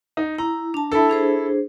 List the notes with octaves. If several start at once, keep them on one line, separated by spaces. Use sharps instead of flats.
D#4
E4 A#5
D4 A5
E4 A4
D4 G#4 C5